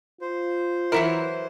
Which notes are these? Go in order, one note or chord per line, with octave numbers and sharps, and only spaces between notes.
F4 C5
E3 F#3 E4 A#4 E5 F#5